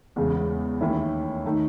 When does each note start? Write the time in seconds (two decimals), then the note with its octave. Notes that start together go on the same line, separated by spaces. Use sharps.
0.16 E2 C#3 G#3
0.81 D#2 D#3 A3 C#4 E4
1.46 D#3 A3 D#4